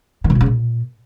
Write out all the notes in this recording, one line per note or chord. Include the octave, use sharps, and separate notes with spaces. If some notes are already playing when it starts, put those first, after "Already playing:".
D#3
B2
A#2
C#3
A#2